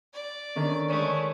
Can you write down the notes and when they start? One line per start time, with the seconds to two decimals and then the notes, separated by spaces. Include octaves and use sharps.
0.13 D5
0.56 D3 D#3 C#4
0.89 G#3 A3 C#5